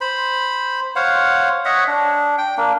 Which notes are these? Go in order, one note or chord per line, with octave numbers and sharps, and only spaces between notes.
C5 B5
C5 C#5 F5 F#5
C#5 D#5 E5 F#5
D4
G5
A#3 D4